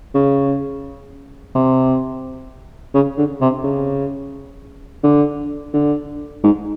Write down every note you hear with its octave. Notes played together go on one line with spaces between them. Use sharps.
C#3
C3
C#3
D3
C3
C#3
D3
D3
G#2